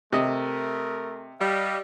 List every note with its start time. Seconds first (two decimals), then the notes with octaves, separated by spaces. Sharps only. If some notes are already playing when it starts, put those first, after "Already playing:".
0.13 C3 A3 A#4 D#5
1.41 G3 D#5 F5